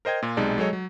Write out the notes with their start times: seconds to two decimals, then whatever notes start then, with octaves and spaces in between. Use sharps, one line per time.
0.05 A#4 C5 D#5 G5 G#6
0.22 A#2 F4
0.37 B1 C3 G#3 D#4 D5 A5
0.58 F#3 G#3 A4 C#5 D#5
0.73 F#3